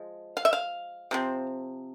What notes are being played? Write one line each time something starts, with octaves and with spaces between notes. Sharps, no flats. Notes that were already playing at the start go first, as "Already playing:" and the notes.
Already playing: F3 G#3
F5
E5
F5
C3 F3 C4